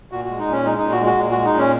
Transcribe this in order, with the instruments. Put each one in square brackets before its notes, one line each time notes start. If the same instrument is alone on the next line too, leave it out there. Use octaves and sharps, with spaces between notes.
[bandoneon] A#2 F#4
F#4
G#3
D#4
A#2 C#4
G#3 D#4
A#2 D#4
F#4
G#3
F#4
A#2
G#3 F#4
D#4
A#2 C#4